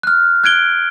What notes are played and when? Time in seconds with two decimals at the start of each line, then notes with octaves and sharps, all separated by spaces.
0.03 F6 F#6
0.44 F#6 G#6 D7 G7